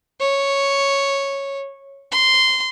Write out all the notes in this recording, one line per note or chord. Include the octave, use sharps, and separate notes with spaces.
C#5
C6